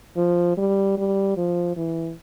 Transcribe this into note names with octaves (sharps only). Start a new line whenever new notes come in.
F3
G3
G3
F3
E3